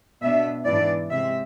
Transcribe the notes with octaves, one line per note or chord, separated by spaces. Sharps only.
B2 B3 D4 E5
G#2 E3 B3 D4 D5
C3 G#3 C4 E5